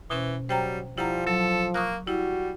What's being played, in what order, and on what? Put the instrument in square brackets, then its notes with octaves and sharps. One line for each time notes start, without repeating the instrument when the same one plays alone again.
[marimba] B2 C#4 C5 [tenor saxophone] E3
[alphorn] F#3 [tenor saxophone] G3 [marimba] C5 G5 A#5
[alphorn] F3 [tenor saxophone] G3 [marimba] E4 F#5 A#5
[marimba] F#3 [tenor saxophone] A4
[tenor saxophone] A#3 [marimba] C#6 D#6 F#6
[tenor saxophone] G3 [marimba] E4 [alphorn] F#4